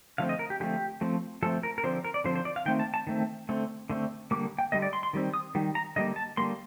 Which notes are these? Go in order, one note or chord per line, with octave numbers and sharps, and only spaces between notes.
D3 F3 A3 C4 F5
D#5
A#4
G4
D3 F3 A3 C4 G4
F3 A3 C4
F3 A3 C4 A4
A#4
A#4
D3 F3 C4 C5
A#4
D5
D3 F3 C4 C5
C5
D5
F5
D#3 A3 C4 G5
A5
A5
D#3 A3 C4
D3 A3 C4
D3 A3 C4
D3 G3 A#3 D6
G5
D3 G3 A#3 D#5
D5
C6
C6
D#3 G3 C4
D#6
D#3 G3
A#5
D3 G3 A#3 D#5
A5
D3 G3 A#3 C6